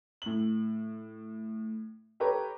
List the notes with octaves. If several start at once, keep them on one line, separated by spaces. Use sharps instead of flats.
A2 F#7
G4 A4 B4 C#5 A#5